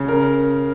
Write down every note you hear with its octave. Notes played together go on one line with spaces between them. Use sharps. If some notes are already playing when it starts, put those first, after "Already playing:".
Already playing: C#3
A#4